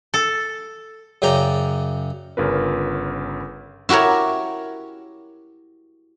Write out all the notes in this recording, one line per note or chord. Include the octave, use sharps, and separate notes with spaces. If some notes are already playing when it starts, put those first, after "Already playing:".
A4
F#2 C#3 D5 G5 A#5
G1 C#3 C#4 F4 A#4 B4
E4 F#4 G4 A#4 C#5